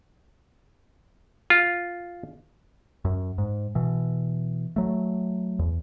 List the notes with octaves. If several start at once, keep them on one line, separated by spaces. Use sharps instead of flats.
F4
F#2
G#2
B2 E3
F#3 A3
E2